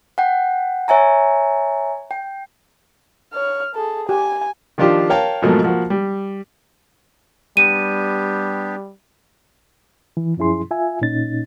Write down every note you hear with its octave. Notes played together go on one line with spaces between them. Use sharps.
F#5 G5
C#5 E5 G#5 A#5
G5
C#5 F6
G#4 A4
G4 G#5
D#3 F3 D4 F4 G4
A#4 C#5 F5 G5 A5
G#2 B2 F3 F#3 A3 A#3
F3 A#3 F#4
G3
G3 B3 D4 G4 D#7
E3
F#2 F3 C#4 E4 G#4 C6
F4 E5 G#5
A#2 C#4 D#4 A6